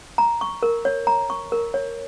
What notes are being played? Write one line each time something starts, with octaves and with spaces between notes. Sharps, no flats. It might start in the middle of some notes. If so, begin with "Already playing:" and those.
A#5
C#6
A#4
C#5
A#5
C#6
A#4
C#5